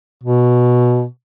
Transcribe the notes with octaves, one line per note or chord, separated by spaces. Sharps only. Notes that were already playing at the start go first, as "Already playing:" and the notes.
B2